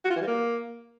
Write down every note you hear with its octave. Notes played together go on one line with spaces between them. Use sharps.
F#4
F4
E3
G3
A#3